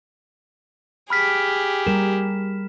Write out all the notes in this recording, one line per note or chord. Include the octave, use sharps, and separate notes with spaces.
G4 G#4 B5 F6 B6
G3 A#4 E7